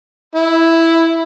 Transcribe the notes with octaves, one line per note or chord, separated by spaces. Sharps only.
E4